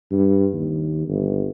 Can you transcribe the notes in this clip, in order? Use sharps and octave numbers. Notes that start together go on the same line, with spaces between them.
G2
D#2
G1